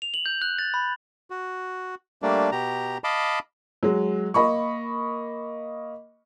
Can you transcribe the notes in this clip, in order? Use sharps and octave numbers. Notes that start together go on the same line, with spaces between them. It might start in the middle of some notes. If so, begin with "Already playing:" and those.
F7
F#7
G6
F#6
A6
B5
F#4
G3 A3 A#3 D4
B2 G4 A#5
D#5 F5 A5 B5 D6
F#3 G#3
A#3 D#5 B5 C#6